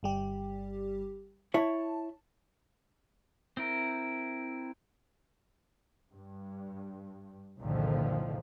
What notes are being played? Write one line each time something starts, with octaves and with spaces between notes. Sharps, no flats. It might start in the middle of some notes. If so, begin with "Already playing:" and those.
G1 G3 G4
E4 C#5 A5
C4 E4 A#4
G2
F#1 C2 A#2 D3 D#3 F3